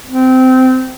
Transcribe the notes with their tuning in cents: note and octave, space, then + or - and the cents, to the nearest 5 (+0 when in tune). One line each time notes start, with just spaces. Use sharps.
C4 -20